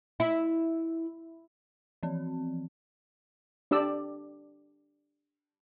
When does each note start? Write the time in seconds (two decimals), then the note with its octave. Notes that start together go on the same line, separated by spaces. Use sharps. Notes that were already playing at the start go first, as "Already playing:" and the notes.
0.20 E4
2.03 E3 F3 C4
3.71 D4 G4 D5 E6